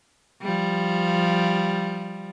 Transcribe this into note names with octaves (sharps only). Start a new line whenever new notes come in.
F3 G3